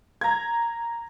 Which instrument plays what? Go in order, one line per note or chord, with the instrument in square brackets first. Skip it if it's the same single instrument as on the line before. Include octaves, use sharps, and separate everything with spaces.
[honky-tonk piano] A#5 G#6